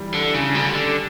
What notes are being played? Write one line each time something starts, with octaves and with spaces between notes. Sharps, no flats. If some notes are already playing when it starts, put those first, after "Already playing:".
Already playing: E3 G3
D3 D4
C#3
D3 G3
D3